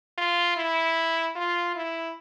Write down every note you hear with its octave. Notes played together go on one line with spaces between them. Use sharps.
F4
E4
F4
E4